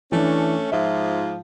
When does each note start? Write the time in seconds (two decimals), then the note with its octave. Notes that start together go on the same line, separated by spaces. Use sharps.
0.12 E3 A3 C#4 D4
0.72 G#2 F3 E5